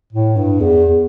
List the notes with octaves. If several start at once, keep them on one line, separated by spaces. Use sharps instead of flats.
A2
G2
E2